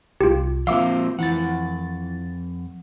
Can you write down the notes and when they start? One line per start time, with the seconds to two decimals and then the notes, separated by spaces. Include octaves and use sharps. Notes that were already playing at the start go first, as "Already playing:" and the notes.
0.21 C2 F4 G4
0.67 F3 A#3 C4 F4 E5 F5 D6
1.19 F2 E3 F#5 A6